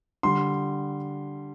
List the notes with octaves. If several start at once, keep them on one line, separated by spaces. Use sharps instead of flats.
D3 G3 C6